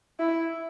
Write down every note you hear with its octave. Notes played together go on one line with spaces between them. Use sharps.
E4